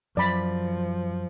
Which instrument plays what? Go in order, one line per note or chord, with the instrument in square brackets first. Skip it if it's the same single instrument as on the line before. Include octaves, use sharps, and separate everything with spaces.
[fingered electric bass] F#2 F#3 [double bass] F3 [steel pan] D5 B5